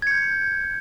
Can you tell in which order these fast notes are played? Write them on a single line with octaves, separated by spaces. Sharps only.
G#6 C#7 G6